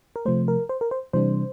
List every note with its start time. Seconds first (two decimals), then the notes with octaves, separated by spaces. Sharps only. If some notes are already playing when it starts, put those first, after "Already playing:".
0.16 A#4
0.25 C3 F3 A3 C5
0.48 A#4
0.69 C5
0.81 A#4
0.91 C5
1.13 C3 E3 G3 D4 C5